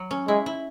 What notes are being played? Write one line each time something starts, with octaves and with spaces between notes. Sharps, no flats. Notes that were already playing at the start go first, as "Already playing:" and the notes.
Already playing: F#3
C#4
G#3 E4
E4